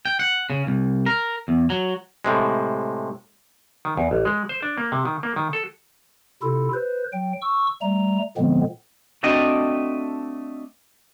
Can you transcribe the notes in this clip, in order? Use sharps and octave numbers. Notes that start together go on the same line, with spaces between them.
G5
F#5
C#3
C2
A#4
E2
F#3
A2 C3 G#3
D#3
E2
A1
G#3
C5
D4
A#3
C3
D#3
A#3
D#3
A4
C3 E4 F4 A4
B4 C5
F#3 G5
C#6 E6
G3 A3 A#5
A#2 D3 F3 G#3 B3 C4
A3 C4 D4 F#4 D#5 G5